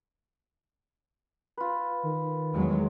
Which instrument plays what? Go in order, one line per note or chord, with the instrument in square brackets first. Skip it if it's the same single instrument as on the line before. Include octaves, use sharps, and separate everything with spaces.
[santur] F4 B4
[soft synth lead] D#3
[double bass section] E2 F#3 G#3